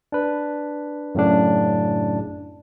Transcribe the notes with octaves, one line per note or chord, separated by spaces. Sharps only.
D4 B4
F#2 A2 C#3 D4